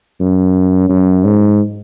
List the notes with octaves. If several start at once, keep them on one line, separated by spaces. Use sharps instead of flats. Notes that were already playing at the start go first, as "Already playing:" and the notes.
F#2
F#2
G#2